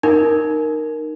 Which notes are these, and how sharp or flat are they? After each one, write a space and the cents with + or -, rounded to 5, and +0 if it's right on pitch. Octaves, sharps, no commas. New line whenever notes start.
D#4 -20 A#4 +0